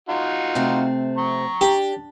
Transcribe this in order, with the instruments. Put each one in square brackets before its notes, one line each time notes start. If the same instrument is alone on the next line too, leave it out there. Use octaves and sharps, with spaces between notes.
[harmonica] D#4 F4 F#4
[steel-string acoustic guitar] C3 A3 C4
[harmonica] A#5 C#6
[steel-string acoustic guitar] D4 [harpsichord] G4